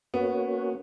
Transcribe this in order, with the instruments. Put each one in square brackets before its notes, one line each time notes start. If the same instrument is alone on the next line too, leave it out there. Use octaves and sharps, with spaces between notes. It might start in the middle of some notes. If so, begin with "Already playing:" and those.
[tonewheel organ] A#3 C#4 F#4 [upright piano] B3